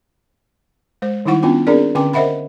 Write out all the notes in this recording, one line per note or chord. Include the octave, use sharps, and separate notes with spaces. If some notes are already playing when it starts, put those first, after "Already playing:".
G#3 C5
D#3 G3 D#4 E4 F#5 C#6
B3 C#4 D4 F4 G5
C4 D4 G#4 A#4 D5
D3 C#4 G5 G#5 D6
A#4 C5 D#5 E5 F#5 B5